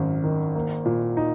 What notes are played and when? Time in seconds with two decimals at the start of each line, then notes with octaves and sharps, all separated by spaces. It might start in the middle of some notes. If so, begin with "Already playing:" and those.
Already playing: G#1 F#2
0.24 D#3
0.55 A#3
0.85 A#2
1.17 D#4